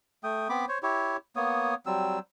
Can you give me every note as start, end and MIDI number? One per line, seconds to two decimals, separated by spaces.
0.24 0.48 57
0.24 0.48 79
0.24 0.48 87
0.49 0.65 59
0.49 0.65 60
0.49 0.65 83
0.49 0.65 86
0.69 0.78 72
0.69 0.78 73
0.83 1.17 64
0.83 1.17 67
0.83 1.17 73
1.36 1.75 58
1.36 1.75 59
1.36 1.75 73
1.36 1.75 87
1.86 2.19 54
1.86 2.19 55
1.86 2.19 60
1.86 2.19 88